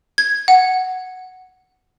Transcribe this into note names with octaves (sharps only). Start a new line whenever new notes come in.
G#6
F#5